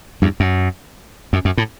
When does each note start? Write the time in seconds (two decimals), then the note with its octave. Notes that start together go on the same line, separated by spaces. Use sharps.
0.22 E2 G2
0.40 F#2
1.33 F#2
1.45 F#2
1.57 A2